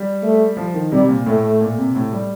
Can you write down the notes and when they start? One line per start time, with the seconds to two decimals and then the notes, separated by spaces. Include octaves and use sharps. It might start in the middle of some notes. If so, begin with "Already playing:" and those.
Already playing: G3
0.23 A3
0.57 F3
0.74 D#3
0.92 C3 G3
1.09 A#2
1.26 A2 A3
1.61 A#2
1.78 C3
1.95 A2
2.12 G3